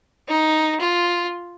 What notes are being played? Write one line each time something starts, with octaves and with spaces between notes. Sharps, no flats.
D#4
F4